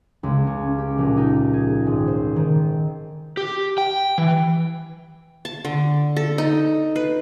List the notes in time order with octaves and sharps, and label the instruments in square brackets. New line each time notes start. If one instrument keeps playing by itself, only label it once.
[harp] C#2
C#4
G4
A#1
D#4
G#4
G#1
C5
D#3
[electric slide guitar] G4
G5
E3
[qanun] A5
D3
A4
D#4
B4